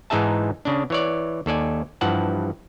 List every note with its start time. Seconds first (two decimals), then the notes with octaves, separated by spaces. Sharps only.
0.10 G#2 E3 D#4 G#4 E5 A5
0.65 C#3 D4
0.90 E3 C#5 D5
1.46 D#2 A4 D5 G#5
2.01 G2 E3 F3 F#5 A5